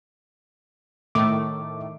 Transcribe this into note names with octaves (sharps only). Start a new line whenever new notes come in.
A2 D#3 A3 D6